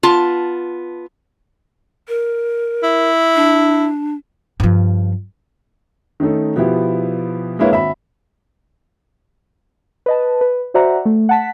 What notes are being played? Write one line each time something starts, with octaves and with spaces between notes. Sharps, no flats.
B3 F4 A5
A#4
E4
D4
G2 F3
D#3 A3 C#4 D#4 A4
B2 F3 B3 E4 G4
G#3 A#3 D4 E4 B4 C#5
G#1 E5 B5
B4 D#5 A5
B4
F#4 C5 D5 E5 F#5 A#5
A3
F#5 A5 B6